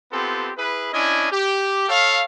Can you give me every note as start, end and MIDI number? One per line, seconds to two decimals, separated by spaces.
0.11 0.50 59
0.11 0.50 60
0.11 0.50 65
0.11 0.50 67
0.11 0.50 69
0.56 0.90 64
0.56 0.90 68
0.56 0.90 71
0.91 1.31 61
0.91 1.31 62
0.91 1.31 64
0.91 1.31 75
0.91 1.31 80
1.31 1.88 67
1.89 2.23 69
1.89 2.23 73
1.89 2.23 77